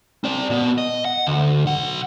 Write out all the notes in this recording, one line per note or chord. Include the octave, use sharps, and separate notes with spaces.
C4 D5
A#2 B3
D#5
F#5
D2
B1 F#5